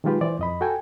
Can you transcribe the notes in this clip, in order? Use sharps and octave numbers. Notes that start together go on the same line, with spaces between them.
D#3 F#3 G#3 F4 G4 B4
E3 C5 D5
F2 D#5 B5
F#4 A4 G5 G#5